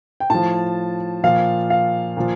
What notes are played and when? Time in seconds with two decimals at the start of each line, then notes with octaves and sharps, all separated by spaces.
0.20 G5
0.30 A2 F3 A5
1.23 A#2 F3 F5
1.70 F5
2.17 A#2 F3